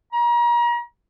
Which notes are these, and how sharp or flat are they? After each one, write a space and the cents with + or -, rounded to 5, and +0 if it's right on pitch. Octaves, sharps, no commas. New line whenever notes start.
A#5 +35